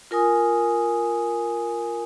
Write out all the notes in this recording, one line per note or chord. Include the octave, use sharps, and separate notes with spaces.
F4 A#4 G#5 D#6